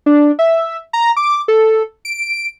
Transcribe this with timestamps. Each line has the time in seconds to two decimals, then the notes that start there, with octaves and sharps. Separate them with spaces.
0.06 D4
0.39 E5
0.93 A#5
1.17 D6
1.48 A4
2.05 D7